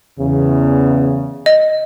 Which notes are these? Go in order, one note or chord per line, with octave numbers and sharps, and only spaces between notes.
E2 C#3
D#5